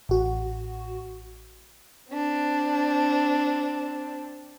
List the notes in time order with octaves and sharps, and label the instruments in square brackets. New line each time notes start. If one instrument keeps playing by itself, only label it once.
[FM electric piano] A1 F#4
[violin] C4 D4